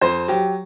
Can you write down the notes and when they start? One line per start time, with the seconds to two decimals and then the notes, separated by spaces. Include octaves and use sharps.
0.01 F2 C5
0.28 F#3 G4